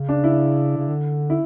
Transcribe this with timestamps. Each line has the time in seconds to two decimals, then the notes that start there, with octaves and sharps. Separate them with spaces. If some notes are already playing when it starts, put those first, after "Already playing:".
Already playing: C#3
0.09 D4
0.24 E4
0.77 C#3
0.88 D3
1.30 E4